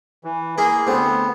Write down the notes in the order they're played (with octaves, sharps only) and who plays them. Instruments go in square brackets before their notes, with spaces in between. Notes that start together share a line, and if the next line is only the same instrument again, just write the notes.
[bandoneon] E3
[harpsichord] A#3 E4 [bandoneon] G#4
[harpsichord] D2 C4 [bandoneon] B3